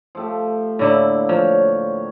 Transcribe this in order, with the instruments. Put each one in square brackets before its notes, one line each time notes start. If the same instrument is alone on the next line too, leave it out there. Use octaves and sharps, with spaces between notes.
[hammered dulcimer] F3 A3 G4
[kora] A2 D3 E4 [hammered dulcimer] A#3
[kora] F3 [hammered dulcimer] C#5